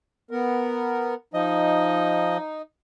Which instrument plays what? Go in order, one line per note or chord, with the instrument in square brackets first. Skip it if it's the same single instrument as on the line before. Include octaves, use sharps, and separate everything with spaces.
[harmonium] B3 A#4
[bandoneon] F3 D#5 [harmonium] D#4